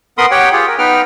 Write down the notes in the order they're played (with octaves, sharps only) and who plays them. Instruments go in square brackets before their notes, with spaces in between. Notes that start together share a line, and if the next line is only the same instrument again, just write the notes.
[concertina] B3 A#4 B5 C6 D#6
G4 C#5 F#5 G5
F4 G4 G#4
A#4
B3 D#4 B4 G5 F6